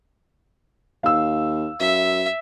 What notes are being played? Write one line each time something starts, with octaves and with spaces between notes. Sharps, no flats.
D#2 F5 E6
F#2 E5